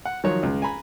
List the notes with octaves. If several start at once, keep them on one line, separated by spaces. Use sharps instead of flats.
F#5
D#3 F3 F#3 C#5
C#2
G#5 A#5 B5